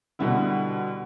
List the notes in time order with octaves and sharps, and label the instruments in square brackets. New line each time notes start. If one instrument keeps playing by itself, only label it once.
[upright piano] B2 D3 G3 B3 E4